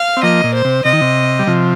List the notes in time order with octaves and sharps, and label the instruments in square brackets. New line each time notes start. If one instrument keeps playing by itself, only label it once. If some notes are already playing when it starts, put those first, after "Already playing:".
Already playing: [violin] F5
[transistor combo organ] C4
[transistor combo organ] F3 A#3 [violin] D#5
[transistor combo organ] A#2
[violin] C5
[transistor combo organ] C3
[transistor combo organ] C3 [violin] D#5
[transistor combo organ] D#3
C3
G3
C3 F3